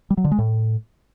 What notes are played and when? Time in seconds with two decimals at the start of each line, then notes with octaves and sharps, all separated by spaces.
0.10 G3
0.17 F#3
0.24 D3
0.31 G#3
0.38 A2